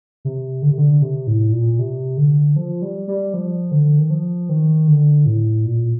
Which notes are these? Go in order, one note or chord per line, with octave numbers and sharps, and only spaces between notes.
C3
D3
C3
D3
C3
A2
A#2
C3
D3
F3
G3
G3
F3
D3
D#3
F3
D#3
D3
A2
A#2